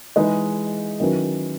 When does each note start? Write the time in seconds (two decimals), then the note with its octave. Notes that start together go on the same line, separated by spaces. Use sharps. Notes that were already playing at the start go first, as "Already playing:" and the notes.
0.16 E3 G#3 D#4 G#4 B4
1.00 D#3 F#3 C#4 E4 B4